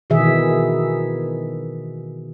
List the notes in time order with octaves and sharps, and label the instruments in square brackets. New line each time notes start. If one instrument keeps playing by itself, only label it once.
[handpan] B2 D#3 E3 G#4 E5